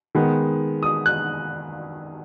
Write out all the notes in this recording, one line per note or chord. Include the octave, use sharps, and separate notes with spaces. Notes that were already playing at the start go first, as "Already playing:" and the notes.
D#3 G#3 B3
D#6
F#6